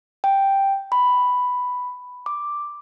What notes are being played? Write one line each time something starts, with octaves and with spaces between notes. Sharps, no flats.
G5
B5
D6